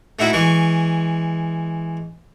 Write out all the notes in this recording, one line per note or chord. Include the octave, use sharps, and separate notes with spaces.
A3 D#4 E4 F#4
E3 G#3 C#6